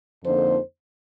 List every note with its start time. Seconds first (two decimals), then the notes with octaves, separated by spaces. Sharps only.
0.23 F2 D3 F3 A#3 D#4 C5